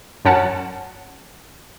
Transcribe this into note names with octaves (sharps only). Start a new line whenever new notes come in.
F#2 C#4 F#5 A5